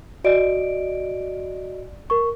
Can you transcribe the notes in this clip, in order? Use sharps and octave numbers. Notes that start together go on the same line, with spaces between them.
F#4 D5 D#5 D7
A#4 C#6